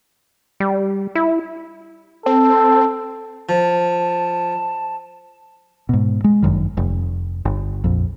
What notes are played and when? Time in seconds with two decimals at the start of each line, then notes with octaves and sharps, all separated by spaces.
0.60 G3
1.15 E4
2.26 C4 A4
3.49 F3 A5
5.89 G#2 B2
6.24 G#3
6.43 G1 F#2 D#3
6.77 F1
7.45 G1
7.84 A#1 F2